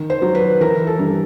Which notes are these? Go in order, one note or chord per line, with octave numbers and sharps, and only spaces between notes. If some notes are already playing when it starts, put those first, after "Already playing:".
Already playing: D#3
C5
F#3
B4
E3 A#4
A4
G2